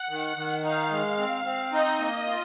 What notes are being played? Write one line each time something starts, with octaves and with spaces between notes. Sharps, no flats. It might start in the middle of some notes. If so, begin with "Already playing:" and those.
Already playing: F#5
D#3
D#3
D#4 F5
G#3
C4
C4
D#4 D#5
A#3
F4